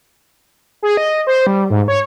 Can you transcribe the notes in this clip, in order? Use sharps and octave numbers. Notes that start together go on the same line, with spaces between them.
G#4
D#5
C5
G3
G#2
C#5